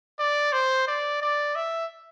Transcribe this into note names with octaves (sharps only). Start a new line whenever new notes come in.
D5
C5
D5
D5
E5